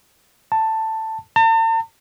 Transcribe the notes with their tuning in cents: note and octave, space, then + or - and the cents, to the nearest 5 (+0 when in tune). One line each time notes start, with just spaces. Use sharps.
A5 +10
A5 +45